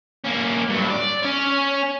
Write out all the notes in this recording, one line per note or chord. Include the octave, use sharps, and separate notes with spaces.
A#3 C#4
G2 F#3
D5
C#4 C#5